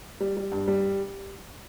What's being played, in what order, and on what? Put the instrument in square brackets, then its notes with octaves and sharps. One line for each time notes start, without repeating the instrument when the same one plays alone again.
[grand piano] G3
G3
G2
G3